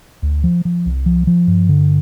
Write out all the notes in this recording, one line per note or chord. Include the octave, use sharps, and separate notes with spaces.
D2
F3
F3
C2
F3
F3
G2
D3